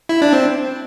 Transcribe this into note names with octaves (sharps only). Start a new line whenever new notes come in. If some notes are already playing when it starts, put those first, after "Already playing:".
E4
D4
C4